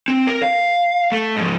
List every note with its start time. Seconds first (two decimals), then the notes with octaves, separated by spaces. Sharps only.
0.08 C4
0.27 A#4
0.42 F5
1.12 A3
1.36 G#2 F3